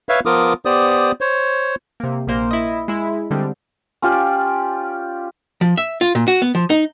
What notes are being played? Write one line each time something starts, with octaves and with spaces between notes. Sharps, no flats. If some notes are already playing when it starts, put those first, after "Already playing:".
B4 C#5 E5 F5
F3 B3 F4 A#4 D6 D#6
B3 G4 C5 D5 D#6
C5 C#5
C3 A#3
A#1 A#2 A#3 C5
E4 D#5
G#3 E4
D3 G3 G#3 C4
C#4 F4 G4 D5
F3
E5
F4
A#2
F#4
B3
F3
D#4